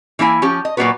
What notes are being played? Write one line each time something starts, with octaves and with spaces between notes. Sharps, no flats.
E3 A#3 E4 G#5
F3 C#4 G4
D#5
A#2 F#3 A#3 B3 F#4 B4